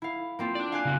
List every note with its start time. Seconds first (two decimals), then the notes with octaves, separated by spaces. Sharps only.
0.02 E4 F5
0.39 A#3 C4 F4
0.55 D4 D5
0.72 F5 G#5 F#6
0.85 C#3 C4 F#4